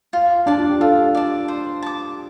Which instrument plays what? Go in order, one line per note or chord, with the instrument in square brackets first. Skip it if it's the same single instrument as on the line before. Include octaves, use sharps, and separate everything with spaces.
[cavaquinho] F4
[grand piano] D4 [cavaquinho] D5 A5
[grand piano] F4
G4
[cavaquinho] F4 [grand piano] A4
[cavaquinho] D5 A5
C5
A5 D6